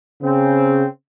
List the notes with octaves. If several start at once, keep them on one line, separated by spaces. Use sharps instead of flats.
C#3 C4